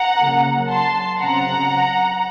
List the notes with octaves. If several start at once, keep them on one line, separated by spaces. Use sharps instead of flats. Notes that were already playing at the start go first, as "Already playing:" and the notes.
Already playing: F#5 A#5
C#3 F#3 A#3
A5 C6
C#3 F#3 C4 F#5 A#5